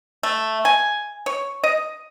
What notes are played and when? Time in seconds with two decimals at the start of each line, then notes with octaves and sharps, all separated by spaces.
0.23 A3
0.65 G#5
1.26 C#5
1.63 D#5